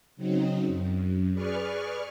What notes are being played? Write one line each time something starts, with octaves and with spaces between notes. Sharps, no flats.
C#3 F#3 C4 D#4
F#2
G#4 B4 D5 C#6 F6